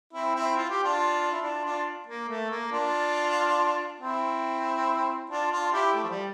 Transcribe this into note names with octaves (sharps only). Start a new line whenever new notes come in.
C4 E4
C4 E4
F4
G4
D4 F4
E4
D4 F4
D4 F4
A#3
A3
A#3
D4 F4
C4 E4
D4 F4
D4 F4
E4 G4
A3
F3
G3